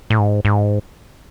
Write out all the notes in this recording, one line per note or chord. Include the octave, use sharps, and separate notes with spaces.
A2
G#2
G#2